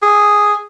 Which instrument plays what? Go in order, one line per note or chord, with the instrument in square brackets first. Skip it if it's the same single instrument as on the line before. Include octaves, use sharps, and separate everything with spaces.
[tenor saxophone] G#4